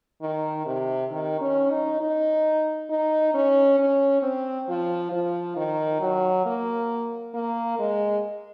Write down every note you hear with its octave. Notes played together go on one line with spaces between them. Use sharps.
D#3
C3
D#3
C#4
D#4
D#4
D#4
C#4
C#4
C4
F3
F3
D#3
F#3
A#3
A#3
G#3